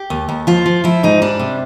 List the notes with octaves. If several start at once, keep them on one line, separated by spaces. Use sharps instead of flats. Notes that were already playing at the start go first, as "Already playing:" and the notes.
Already playing: G4
D#2
D#2
F3 F4
F3
F3 E4
G#2 D#4
G3 D4
C3